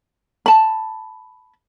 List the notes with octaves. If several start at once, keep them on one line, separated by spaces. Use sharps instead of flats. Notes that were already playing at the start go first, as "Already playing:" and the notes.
A5 B5